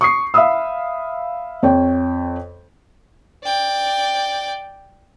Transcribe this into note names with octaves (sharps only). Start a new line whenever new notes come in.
C#6 D#6 C7
E5 F5 B5 D#6 E6
F2 C#5 G5
D5 G5